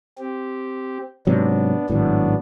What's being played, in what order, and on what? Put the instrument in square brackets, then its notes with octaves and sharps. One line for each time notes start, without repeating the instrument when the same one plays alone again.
[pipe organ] C4 G4
[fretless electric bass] G#2 C3 F#3 [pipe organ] B3 D4
[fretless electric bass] G#1 A2 [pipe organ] F#3 B3 D4